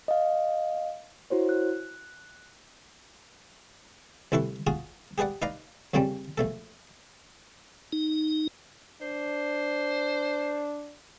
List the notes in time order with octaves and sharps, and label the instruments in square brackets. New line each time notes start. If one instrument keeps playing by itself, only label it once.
[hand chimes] D#5 F5
E4 F#4 C5 C#5
F#6
[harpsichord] C2 A2 E4 A4 B4 C#6
F4 F#4 G#4 G#5
G4 G#4 B4 D5 F#5
D#4 B4 D5 F5 A#5
F2 A#2 C#3 G3 C4 C#4
A#1 A3 A4
[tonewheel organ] D#4
[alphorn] D4 [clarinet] C5